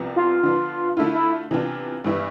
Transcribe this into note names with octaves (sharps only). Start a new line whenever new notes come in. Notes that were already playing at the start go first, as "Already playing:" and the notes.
Already playing: C2 C3 F3 B3
F4
D3 F3 B3 D4
D3 A3 D4 E4 F4
E4
C3 E3 B3 D4 F4
G2 E3 G3 B3 E4